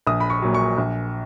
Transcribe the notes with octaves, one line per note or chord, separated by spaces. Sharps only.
A#1 D#6
B5
C#6
A#2 F#3
C#6
A#1